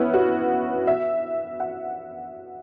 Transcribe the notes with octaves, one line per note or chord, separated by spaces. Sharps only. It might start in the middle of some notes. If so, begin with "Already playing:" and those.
Already playing: B3 C#4 E4
F#4
E5
F#5